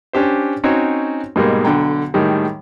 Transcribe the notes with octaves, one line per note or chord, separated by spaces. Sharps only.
C#4 D4 G4 C5
C4 C#4 D#4 F#4 C5 C#5
G#2 B2 G3 G#3 A#3
B1 D3 G5 A#5
A2 D#3 G3 G#3